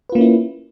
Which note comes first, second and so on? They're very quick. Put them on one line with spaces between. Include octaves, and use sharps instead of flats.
B4 F4 A#3 C#4 E4